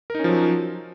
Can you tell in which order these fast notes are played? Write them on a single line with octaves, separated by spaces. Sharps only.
A#4 D#4 C#4 F3 F#3